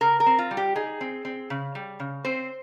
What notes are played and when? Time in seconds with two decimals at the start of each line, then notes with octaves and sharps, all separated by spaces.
0.01 C#3 A#4
0.20 A#4
0.26 C4
0.39 F4
0.51 G3
0.57 G4
0.75 D#4 G#4
1.01 C4
1.25 C4
1.50 C#3
1.75 G3
2.00 C#3
2.25 C4 C5